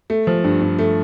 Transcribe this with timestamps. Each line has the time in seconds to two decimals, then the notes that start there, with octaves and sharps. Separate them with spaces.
0.10 A3
0.27 F3
0.44 G2
0.61 G2
0.79 A3